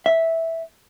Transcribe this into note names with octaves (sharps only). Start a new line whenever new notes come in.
E5